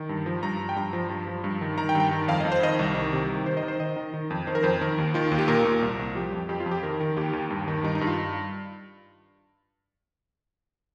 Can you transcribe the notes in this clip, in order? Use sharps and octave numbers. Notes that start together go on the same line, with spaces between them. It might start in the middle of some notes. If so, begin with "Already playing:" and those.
Already playing: D#3
G2
F3
G2 A#5
F3
G5
G2 A#5
F3
G2
F3
G2
D#3
D#3 A#5
G5
G2
G5
D#3
F2 F5
F2 D#5
C5
D#3 D#5
C2
D#3
C3
D#3
D#3 C5
D#5
D#3
C5
D#3 D#5
D#3
D#3
F2
D#3 C5
A#4
F2 C5
D#3 A#4
D#2
D#3 F4
D#2
G4
A#2 A#4
A#2
C2
C2
F3 G4
F2
F2 G4
F4
F2
G4
D#3 A#4
D#3
D#2 G4
D#2
G2
D#3
G2 D#4
D#4
G2
F4